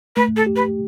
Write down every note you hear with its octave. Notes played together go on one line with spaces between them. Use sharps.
A3 B4
A4
G4
B4